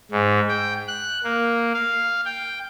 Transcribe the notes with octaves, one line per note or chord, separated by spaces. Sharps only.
G#2
G5
F#6
A#3
F5
G5